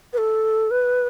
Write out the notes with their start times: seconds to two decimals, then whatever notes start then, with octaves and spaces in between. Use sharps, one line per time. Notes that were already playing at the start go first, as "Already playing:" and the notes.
0.13 B4
0.18 A4
0.71 B4